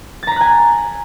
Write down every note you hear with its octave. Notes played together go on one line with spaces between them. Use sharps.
G#5 A#5 F#6 A6 B6